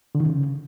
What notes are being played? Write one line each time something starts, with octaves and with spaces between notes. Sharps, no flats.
D3
D#3
C#3